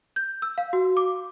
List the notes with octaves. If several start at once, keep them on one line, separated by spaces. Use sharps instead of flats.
G6
E6
F5
F#4
D6